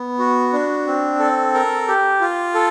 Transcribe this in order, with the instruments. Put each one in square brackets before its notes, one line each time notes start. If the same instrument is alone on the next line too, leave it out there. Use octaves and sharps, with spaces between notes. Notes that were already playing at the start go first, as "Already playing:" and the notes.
Already playing: [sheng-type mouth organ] B3
F#4
D4
C4
A4
A#4
G4
F4
A4